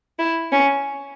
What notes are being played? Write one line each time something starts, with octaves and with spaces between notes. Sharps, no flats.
E4
C#4